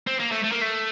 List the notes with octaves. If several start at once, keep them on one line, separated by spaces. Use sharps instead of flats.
C4
A#3
A3
A3
A#3
A3